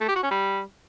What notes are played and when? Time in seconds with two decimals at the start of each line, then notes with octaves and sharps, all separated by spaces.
0.01 A3
0.08 G4
0.16 F#4
0.23 C#4
0.31 G3